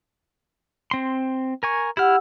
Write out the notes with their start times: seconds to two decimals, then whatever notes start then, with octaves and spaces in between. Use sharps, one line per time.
0.91 C4 C6
1.63 A#4 G#5 C#6
1.97 E4 G4 F#5 E6 F6